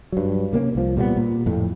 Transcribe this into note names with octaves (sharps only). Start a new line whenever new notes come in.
G2 F#3
C3 A#3 C4 C#4
C2 F3
A#2 G3 G#3 B3
A#2
F2 A2